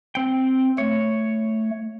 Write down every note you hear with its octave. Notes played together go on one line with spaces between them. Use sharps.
C4 G5
A3 C#5